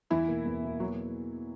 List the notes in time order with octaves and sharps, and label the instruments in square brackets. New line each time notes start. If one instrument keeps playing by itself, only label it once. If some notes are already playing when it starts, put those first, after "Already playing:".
[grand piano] E2 [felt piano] E3 E4
[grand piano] B2 A#3
E2
B2 A#3
[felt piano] F#3 F#4